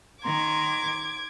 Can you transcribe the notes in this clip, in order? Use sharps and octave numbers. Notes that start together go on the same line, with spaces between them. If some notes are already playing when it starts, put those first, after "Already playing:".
D#3 A#5 C6 D6 G#6